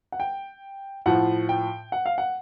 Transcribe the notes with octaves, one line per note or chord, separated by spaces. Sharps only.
F#5
G5
A2 F3 F#5
G5
F#5
F5
F#5